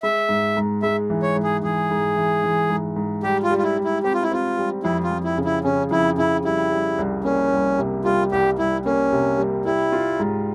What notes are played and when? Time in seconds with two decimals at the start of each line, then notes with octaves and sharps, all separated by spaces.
0.03 G#3 E5
0.29 G#2
0.57 G#2
0.82 G#3 E5
1.10 E3
1.23 C#5
1.36 G#2
1.43 G#4
1.63 E3 G#4
1.91 G#2
2.16 E3
2.44 E3
2.70 G#2
2.96 G#2
3.23 G3 G4
3.43 F4
3.51 G3
3.58 F4
3.63 E4
3.77 G3
3.84 E4
4.03 C4 G4
4.14 F4
4.23 E4
4.31 C4 F4
4.58 G3
4.84 F2 E4
5.04 F4
5.11 F2
5.24 E4
5.38 C#3
5.45 E4
5.64 C#3 C#4
5.91 F2 E4
6.18 C#3 E4
6.44 G3 E4
6.72 G3
6.99 C2
7.24 A#3 C#4
7.52 C2
7.79 C3
8.05 G3 F4
8.32 C2 G4
8.58 C2 E4
8.86 A#3 C#4
9.12 C3
9.38 G3
9.65 G3 E4
9.92 F4
10.20 G#2